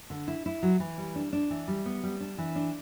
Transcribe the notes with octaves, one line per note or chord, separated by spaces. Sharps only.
D3
E4
E4
F#3
E3
G3
D4
D4
E3
G3
B3
G3
D4
E3
D4